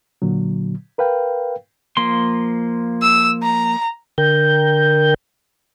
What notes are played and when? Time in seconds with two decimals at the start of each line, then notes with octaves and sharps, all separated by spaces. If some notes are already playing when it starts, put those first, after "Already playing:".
0.22 A#2 D3 F#3
0.98 A#4 B4 F5 G5
1.97 F3 A#3 C6
3.02 E6
3.43 A#5
4.18 D3 A#4 G5 G6